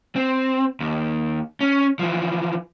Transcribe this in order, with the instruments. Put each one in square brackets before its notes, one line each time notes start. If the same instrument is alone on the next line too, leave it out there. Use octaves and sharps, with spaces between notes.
[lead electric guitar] C4
D#2
C#4
E3 F3